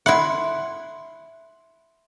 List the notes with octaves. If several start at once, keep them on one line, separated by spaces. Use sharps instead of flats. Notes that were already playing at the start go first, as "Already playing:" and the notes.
E4 E5 F#5 B5 C6